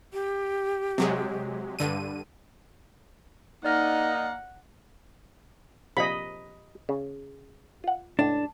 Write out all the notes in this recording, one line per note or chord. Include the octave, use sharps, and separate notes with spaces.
G4
C3 F#3 G#3
G2 D3 D#7
A#3 D#4 D5 F#5 F6 A#6
A#1 C3 F3 D#5 B5
C#3
F4 F#5
C#2 A2 D4